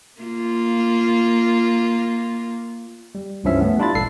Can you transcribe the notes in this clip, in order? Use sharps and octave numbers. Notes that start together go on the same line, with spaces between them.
A#3 F4
G3
C#2 G2 E3 F3 C#4 E5
A3 B3
G3 D4 E4 F4 B5 A6
A1 A#2 A4 C7